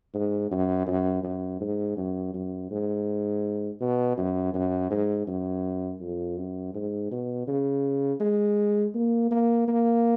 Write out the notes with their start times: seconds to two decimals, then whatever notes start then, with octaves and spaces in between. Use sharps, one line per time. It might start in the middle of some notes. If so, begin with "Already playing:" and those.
0.14 G#2
0.51 F#2
0.87 F#2
1.24 F#2
1.61 G#2
1.97 F#2
2.34 F#2
2.71 G#2
3.81 B2
4.17 F#2
4.54 F#2
4.91 G#2
5.27 F#2
6.01 F2
6.37 F#2
6.74 G#2
7.11 B2
7.47 C#3
8.20 G#3
8.95 A#3
9.31 A#3
9.68 A#3